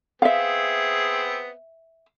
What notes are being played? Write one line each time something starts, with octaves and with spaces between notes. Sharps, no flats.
B3 C4 G#4 E5 F5